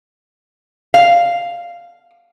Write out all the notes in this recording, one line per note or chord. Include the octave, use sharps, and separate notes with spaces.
F5